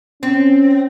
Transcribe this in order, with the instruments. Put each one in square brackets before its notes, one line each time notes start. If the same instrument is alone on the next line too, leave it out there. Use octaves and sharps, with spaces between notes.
[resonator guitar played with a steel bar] C4 [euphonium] C#4